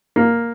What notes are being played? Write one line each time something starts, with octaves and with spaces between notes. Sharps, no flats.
A#3